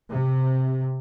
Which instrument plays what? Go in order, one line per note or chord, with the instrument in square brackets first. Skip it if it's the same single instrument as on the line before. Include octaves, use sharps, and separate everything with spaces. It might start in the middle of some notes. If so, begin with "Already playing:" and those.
[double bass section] C3